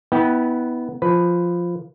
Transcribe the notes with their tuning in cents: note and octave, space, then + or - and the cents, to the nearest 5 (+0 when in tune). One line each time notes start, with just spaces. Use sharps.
B3 +0 E4 -35 G5 +0
F3 +0 B4 +10